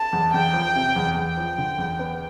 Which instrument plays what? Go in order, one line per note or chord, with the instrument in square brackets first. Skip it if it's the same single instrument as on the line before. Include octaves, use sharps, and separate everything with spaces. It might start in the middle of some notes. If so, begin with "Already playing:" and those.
Already playing: [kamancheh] A5
[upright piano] E2
[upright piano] E2 [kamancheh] G5
[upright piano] F3
C3
E2
[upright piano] E2 [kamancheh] G5
[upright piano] F3
D3
E2
B3